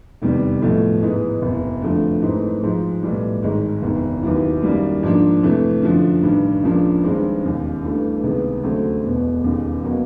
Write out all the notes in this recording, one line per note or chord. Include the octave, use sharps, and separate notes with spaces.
F1 E2 C3 D#3 G3
B1 A2 F3 A3
G#2 E3 G#3 B3 D#4
F#1 E2 C3
F2 D3 F3 A3
G#2 E3 A3 C4 D#4
G#2 F3 G#3
B1 A2 E3 G3
G#1 G#2 D#3 G#3
F#1 E2 C3 D#3
D#2 D#3 F#3 B3 E4
F#2 D#3 G3 A#3
G#2 F3 A#3 D4
F2 C3 E3 A3
F#2 D3 F3
A1 G2 D#3
C#2 C#3 F3 A#3 D4
G2 D#3 G#3 C4
E1 D#2 C#3
G2 E3 A3
C#2 C3 D#3 G#3 B3
D2 C#3 F#3 A3 C4
E1 E2 B2
E1 D#2 C#3
B2 F#3 A#3